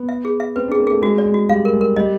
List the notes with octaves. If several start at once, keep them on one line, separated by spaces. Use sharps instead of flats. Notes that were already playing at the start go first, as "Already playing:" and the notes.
Already playing: B3
E5
G#4
E5
C4 B4
D4 G#4
A#3
A3 G#4
G#3 F#4
D5
G#3
F#4
G3 F5
A#4
G#3
A#4
G3 D#5